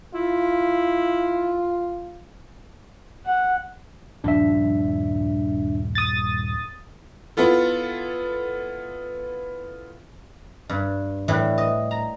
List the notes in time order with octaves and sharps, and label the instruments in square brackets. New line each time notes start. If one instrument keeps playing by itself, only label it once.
[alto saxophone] E4 [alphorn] F4
[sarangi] F#5
[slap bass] D#1 G2 F3 [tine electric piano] D4 E5
[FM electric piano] D#6 A6
[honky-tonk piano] B3 E4 F4 A4
[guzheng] G2
A2 E3 G3 D4 G4
D#5
A#5